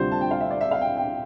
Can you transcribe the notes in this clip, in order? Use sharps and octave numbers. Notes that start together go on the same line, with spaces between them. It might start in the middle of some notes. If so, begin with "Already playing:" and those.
Already playing: D2 C3 G3 D4 F4 C5
A5
G5
F5
E5
D5
E5
F5
G5
G5